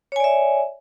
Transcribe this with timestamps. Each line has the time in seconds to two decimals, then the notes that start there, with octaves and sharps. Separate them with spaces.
0.12 C#5
0.16 G#5
0.20 D5
0.24 E5